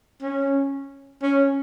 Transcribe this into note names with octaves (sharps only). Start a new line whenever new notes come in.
C#4
C#4